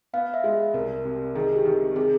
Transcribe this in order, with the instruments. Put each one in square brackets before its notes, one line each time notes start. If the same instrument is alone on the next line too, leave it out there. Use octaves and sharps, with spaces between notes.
[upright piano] B3 [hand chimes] F5
[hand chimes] E5
[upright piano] G#3
[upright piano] C2 [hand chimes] A#4
[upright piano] C3
[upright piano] D#3 [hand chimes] G#4
[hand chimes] G4
[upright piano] D#3
[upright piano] C3 [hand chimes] G#4